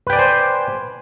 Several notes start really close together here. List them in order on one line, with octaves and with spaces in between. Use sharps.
B4 G5 D5 G#5 C5